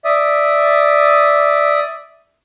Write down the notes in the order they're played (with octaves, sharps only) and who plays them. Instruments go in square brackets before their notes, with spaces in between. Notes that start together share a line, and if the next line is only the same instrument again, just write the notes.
[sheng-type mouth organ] D5 E5 D#6